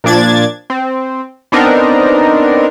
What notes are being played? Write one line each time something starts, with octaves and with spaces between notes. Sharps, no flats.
A#2 F3 D4 G#6 A6
C4
B3 C4 D4 D#4 A#4